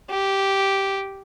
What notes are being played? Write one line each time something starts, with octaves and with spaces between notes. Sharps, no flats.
G4